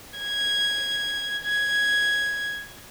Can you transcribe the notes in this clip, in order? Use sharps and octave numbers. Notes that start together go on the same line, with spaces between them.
G#6
G#6